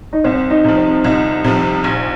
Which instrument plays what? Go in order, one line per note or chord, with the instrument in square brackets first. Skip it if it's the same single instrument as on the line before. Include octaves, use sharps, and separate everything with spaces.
[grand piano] D#4
[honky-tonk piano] C2 [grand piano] C4
[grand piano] D#4
[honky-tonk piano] C3 F3
[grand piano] C4
[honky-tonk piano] C2 [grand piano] D#4
[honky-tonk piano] C3 F3
A#1